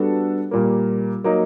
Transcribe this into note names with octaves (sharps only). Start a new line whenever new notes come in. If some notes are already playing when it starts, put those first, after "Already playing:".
Already playing: G3 B3 D4 F#4 A4
A#2 G3 A#3
F#3 A#3 D#4